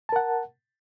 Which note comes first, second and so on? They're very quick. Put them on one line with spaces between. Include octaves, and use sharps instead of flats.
A5 A#4 F#5